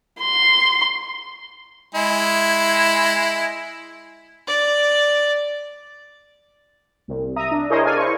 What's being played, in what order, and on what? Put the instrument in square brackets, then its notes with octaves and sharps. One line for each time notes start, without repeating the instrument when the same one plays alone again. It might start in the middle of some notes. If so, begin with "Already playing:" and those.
[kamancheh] C6
[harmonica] G#3 E4
[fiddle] D5
[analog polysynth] C2
E5 A#5 D#6
D4
E4 G#4 A#4 C5 C#5 D#5
A4 A#4 D5 F5 G#5
E4 C5 C#6